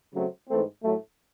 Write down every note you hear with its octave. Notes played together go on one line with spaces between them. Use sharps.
C#3 F#3 A3 C4
G#2 E3 A3 C4
A2 F#3 A3